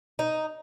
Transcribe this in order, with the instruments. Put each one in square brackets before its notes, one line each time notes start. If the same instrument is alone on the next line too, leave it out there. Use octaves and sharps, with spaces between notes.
[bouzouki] D#4